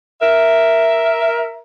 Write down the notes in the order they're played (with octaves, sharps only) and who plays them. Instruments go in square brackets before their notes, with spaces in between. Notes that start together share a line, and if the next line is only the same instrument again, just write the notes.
[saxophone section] A#4 E5